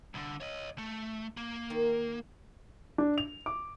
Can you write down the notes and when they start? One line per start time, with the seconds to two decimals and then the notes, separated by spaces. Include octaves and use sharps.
0.14 C2 D3
0.40 C#5 D#5
0.78 A3
1.37 A#3
1.70 D#3
2.98 D4
3.18 F7
3.46 D6